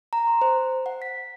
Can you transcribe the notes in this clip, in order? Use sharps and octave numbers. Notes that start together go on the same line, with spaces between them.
A#5
C6
C5
F#5
B6